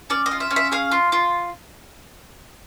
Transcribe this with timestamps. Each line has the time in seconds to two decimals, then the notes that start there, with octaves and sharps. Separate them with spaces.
0.10 C#4 D5
0.26 D#5
0.31 F4
0.40 E5
0.51 C#4
0.56 E5
0.72 G#4 F5
0.91 F4
1.12 F4